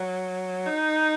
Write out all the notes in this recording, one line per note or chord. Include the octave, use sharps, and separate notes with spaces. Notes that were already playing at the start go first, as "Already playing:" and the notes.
Already playing: F#3
D#4